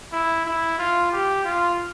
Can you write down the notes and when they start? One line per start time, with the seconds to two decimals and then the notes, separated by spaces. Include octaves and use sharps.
0.13 E4
0.46 E4
0.78 F4
1.12 G4
1.45 F4